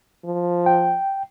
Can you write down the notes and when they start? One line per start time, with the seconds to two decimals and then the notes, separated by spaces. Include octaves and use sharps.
0.25 F3
0.66 G5